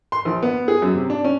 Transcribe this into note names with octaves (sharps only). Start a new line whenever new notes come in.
C6
A#1
B3
G#4
F#2
C3
D4
C#4